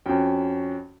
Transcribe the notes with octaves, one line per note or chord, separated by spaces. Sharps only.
F2 C#4 F#4 G5